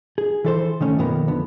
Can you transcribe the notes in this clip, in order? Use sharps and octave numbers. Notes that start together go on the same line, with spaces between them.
G#4
E3 A4 C5
D#3 A3 C#4
B1 F#2 D#3 F3 A#3 B3
D3 B3